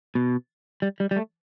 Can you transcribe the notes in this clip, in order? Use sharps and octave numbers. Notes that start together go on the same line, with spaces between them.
B2
G3
G3
G3
A3